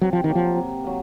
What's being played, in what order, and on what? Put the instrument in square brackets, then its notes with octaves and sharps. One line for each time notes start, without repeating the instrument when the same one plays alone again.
[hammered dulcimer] C3 [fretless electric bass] F#3
[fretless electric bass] F3
D#3
[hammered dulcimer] F#3 A#3
[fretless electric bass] F3
[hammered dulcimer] C3
F#3 A#3